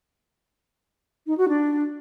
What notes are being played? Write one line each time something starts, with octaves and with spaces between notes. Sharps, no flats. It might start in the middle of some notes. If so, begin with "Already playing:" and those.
D#4
F#4
D4